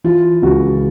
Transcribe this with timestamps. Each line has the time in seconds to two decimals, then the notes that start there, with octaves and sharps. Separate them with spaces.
0.04 E3 F4
0.42 C#2 F#4